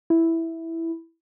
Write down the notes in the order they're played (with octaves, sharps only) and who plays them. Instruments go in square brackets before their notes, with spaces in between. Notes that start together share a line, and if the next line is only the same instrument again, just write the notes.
[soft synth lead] E4